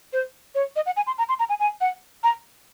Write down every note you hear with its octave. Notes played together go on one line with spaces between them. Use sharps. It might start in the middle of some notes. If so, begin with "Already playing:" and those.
C5
C#5
D#5
F#5
G#5
C6
A#5
C6
A#5
G#5
G#5
F#5
A#5